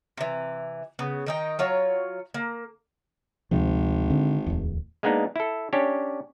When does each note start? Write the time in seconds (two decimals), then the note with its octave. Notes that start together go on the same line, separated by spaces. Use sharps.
0.17 C3 E3
0.99 C#3 B3
1.26 D#3 D#4 G5
1.59 F#3 F4 C#5
2.34 A#3
3.51 G#1 D2 C3 F3
4.10 D3 C4 D4
4.47 D1 E2
5.03 G#3 A#3 B3 D4 D#4
5.36 E4 A4
5.73 C#4 D4 G4 C#5